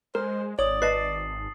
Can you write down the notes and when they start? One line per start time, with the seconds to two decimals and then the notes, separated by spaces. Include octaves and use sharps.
0.15 G#3 A#4 C5
0.59 G#1 C#5 D5 D#6 F#7
0.82 B4 D#5 A5 A6 C7